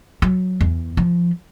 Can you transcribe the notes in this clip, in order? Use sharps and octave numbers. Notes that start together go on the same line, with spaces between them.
F#3
E2
F3